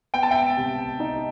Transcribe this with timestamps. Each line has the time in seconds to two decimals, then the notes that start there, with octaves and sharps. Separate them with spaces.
0.14 B3 G5
0.23 A5
0.31 E5 G5
0.57 C3
1.00 D#4